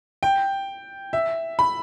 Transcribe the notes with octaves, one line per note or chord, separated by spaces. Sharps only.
G5
E5
B5